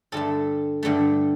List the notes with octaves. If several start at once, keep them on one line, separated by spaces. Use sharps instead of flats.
G2 D3 A3 A4
G2 D3 A3